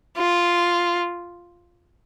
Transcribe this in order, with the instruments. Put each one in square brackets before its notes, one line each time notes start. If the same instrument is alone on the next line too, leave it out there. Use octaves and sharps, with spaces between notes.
[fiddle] F4